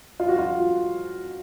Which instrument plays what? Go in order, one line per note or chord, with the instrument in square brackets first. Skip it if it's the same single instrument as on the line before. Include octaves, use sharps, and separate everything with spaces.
[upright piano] F4
F#4
F4